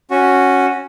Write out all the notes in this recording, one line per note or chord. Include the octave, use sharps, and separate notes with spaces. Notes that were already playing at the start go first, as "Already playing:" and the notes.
C#4 F#4